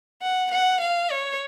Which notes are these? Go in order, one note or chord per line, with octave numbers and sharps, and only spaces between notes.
F#5
F#5
F5
C#5